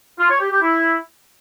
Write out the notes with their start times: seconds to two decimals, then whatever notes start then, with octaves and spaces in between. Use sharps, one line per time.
0.19 F4
0.29 C#5
0.40 G4
0.51 G4
0.61 E4